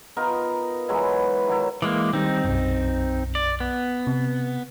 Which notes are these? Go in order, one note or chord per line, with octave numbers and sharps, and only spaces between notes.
B3 D#4 F4 A#4
E3 F#3 G#3 E4
D#3 F#3 E4
E3 G#3 A#3 D6
D#3 G3 C4 D#4
B1 F#2
D5
B3
C3